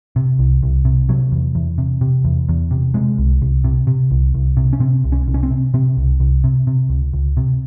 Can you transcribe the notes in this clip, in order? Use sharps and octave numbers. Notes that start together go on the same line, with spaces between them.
C3
C2
C2
C3
C3 F#3
E2
E2
C3
C3
E2
E2
C3
C3 G#3
C2
C2
C3
C3
C2
C2
C3
C#4
C3 C4
C2
C#4
C2
C#4
C4
C3
C3 C4
C2
C2
C3
C3
C#2
C#2
C3